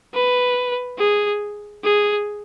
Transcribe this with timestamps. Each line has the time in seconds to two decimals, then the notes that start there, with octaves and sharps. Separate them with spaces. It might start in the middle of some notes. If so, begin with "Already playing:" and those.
0.14 B4
0.99 G#4
1.84 G#4